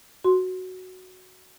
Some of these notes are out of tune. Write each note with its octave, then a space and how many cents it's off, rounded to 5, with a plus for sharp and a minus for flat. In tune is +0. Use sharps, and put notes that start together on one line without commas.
F#4 +0 C6 +0